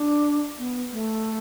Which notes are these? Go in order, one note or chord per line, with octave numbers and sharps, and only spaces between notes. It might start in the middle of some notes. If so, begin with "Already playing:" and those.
Already playing: D4
B3
A3